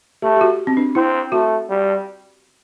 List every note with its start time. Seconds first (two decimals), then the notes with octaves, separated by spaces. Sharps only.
0.22 A3 G4
0.36 G4
0.41 F#4
0.67 C4
0.77 D4
0.95 C4 E4
1.32 A3 F#4
1.69 G3